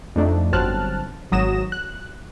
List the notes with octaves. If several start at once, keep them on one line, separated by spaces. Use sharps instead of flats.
F2 A3 D4 D#4
G1 F#3 C4 A5 F6 F#6
G#1 F#3 D#6 A#6 E7
F#6